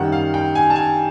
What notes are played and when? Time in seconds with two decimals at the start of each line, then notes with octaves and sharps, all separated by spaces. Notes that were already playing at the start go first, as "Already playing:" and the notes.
Already playing: F#2 D#3 G3 F#5
0.12 F5
0.34 G5
0.55 G#5
0.70 A5
0.76 G#5